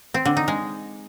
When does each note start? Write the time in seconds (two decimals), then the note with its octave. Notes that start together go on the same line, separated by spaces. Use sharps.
0.14 C4
0.25 D3
0.37 D#4
0.48 G#3